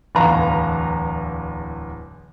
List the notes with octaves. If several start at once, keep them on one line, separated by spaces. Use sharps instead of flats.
D1 E2 B4 F5 A#5